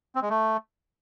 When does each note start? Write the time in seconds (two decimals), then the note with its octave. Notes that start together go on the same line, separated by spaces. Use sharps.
0.15 C4
0.22 G#3
0.29 A3